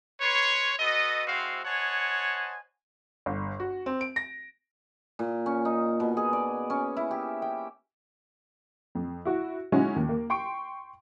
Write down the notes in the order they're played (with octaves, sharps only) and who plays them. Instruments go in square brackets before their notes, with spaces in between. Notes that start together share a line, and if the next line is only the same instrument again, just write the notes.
[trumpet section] B4 C#5 C6
F#4 A4 B4 D#5
G#3 C4 E4 F#4 C5 F5
C5 C#5 D#5 F#5 G#5 A5
[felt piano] G1
F#4
C4
D7
A#6
[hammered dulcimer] A#2
C#4
D#4
B2
G#4
D5
C#4
E4
G4
G5
[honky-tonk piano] F2
E4 F#4
G#3 C#4 D#4 E4 F#4
D#2
A#3
G5 C6 C#6 D7